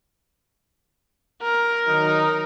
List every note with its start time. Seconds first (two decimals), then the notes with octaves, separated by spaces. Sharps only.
1.42 A#4
1.87 D#3 F#3 D#4